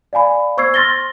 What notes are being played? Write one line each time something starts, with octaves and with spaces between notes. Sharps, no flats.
D5 F5 G#5 B5
C5 C#6 E6 G#6 C7
C6 F6 A6 A#6 G7